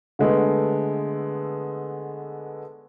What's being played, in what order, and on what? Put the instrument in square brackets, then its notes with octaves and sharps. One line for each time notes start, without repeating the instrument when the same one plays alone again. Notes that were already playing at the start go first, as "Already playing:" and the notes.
[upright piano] D3 G#3 A3 B3